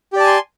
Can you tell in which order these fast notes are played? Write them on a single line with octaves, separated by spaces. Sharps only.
G4 D5 A5 G#5 C6